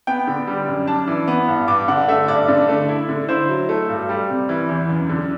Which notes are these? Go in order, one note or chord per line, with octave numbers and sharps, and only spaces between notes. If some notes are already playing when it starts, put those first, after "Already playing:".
B3 G5
D3
G3
F#2
D4 A5
E3
B3
G2
G2 D6
D3 F#5
A3 E5
G2 D5
D3
A3
E4
D3
E4 C5
F#3
A3
G2
G3
C3
E3
E2
F#2
D3